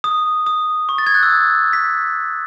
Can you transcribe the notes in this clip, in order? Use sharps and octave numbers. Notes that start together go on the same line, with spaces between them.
D#6
D#6
C#6
A6
G#6
F#6
E6
D#6
B6